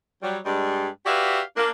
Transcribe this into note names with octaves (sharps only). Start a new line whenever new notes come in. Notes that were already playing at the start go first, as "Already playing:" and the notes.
F#3 G3
G2 G3 G#3
F#4 G4 B4 D5 E5 F5
A#3 D4